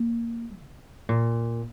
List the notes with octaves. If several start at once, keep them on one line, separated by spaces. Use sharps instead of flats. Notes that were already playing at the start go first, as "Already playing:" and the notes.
Already playing: A#3
C3
A#2